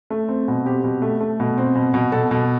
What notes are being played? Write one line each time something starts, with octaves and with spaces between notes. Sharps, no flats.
A3
C4
B2
C4 G4
B2
A3
A3
B2
C4
B2
B2
B2 A4
B2